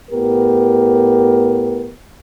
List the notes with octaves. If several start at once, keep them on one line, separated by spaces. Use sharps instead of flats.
A2 B3 G4 A#4